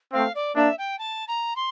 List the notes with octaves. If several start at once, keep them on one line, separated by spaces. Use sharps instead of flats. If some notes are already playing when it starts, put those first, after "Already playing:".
A3 C4 F5
D5
A#3 D4 E5
G5
A5
A#5
C6